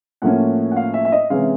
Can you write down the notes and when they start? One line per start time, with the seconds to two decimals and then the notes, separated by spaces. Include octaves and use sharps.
0.22 A2 F3 A#3 C#4 F#5
0.72 F#5
0.76 F5
0.94 E5
1.05 E5
1.12 D#5
1.30 C3 E3 G#3 C#4 E4 F5